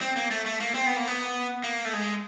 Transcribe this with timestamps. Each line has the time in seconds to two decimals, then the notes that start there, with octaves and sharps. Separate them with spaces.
0.01 C4
0.16 A#3
0.31 A3
0.46 A3
0.60 A#3
0.74 C4
0.86 B3
0.96 A#3
1.08 B3
1.64 A#3
1.85 A3
1.93 G#3